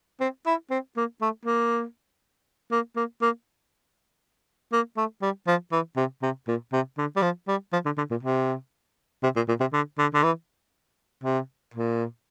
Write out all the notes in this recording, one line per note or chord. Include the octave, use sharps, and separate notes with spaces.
C4
E4
C4
A#3
A3
A#3
A#3
A#3
A#3
A#3
A3
G3
F3
E3
C3
C3
A#2
C3
D3
G3
F3
G3
F3
D3
D3
A#2
C3
C3
A#2
A#2
C3
D3
D3
D3
E3
C3
A#2